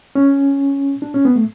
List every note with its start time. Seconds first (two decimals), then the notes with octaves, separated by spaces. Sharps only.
0.15 C#4
1.02 D4
1.14 C#4
1.25 B3
1.36 A3